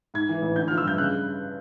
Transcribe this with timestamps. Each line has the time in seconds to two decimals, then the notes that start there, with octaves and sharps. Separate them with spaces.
0.14 G#2 G#6
0.29 E3
0.42 A1
0.56 D3 G6
0.68 F3 F6
0.77 E6
0.85 G2 G6
0.98 C#3 F#6